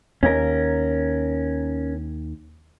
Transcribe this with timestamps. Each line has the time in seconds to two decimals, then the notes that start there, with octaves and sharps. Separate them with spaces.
0.23 D#2 C#4 A#4